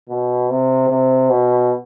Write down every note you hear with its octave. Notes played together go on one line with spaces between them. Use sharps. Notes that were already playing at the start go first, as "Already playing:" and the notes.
B2
C3
C3
B2